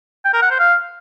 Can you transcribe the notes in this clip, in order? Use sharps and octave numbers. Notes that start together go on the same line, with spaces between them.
G5
A#4
F#5
C5
F5